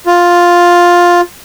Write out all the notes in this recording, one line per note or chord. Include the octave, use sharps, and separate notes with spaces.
F4